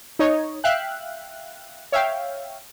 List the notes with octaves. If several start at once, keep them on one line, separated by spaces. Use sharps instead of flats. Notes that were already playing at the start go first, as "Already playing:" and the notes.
D#4 C#5 D#5
E5 F5 G5 F#6
C#5 E5 F5 G5